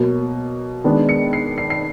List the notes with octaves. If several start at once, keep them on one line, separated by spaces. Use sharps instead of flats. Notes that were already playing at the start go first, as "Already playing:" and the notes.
Already playing: B2 F#3 A#3
D#3 G#3 B3 D4
C#7
C7
C7
C7